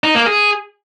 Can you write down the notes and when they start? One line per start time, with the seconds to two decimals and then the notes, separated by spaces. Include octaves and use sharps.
0.04 D#4
0.15 A#3
0.26 G#4